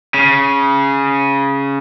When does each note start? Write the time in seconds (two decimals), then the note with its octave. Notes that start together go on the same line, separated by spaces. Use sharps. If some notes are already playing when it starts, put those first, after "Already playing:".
0.14 C#3